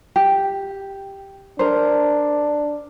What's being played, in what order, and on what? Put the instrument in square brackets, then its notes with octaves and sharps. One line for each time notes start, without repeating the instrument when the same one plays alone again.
[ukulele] G4
[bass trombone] D4 [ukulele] A#4 C5